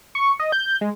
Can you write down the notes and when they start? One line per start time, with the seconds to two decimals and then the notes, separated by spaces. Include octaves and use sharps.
0.15 C#6
0.40 D#5
0.52 G6
0.81 G#3